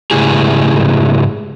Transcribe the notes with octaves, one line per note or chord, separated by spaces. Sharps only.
G#2 C#3 A3 E4 G4 G#4